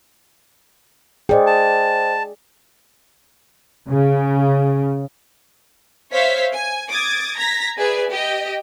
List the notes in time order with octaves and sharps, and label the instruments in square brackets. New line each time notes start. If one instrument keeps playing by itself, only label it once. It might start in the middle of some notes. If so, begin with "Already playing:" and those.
[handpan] G#4 D5 [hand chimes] C5 D#5 G5
[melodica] A5
[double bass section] C#3
[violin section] C5 C#5 E5 F5 B6
G#5
D6 D#6 G#6 A6
A#5 G#6 A#6 B6
G#4 B4 D5 E5 G#5
G4 D#5 G5